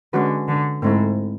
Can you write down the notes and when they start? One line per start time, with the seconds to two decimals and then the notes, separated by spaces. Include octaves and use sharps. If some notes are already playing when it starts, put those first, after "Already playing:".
0.13 D3 G#3 C#4 F#4 B4
0.48 D3
0.82 G#2 A3 C4 E4